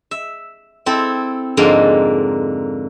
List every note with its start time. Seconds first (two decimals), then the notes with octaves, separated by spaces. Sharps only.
0.11 E5
0.86 C4 E4 A4
1.57 F2 G#2 D3 A#3 D#5 C6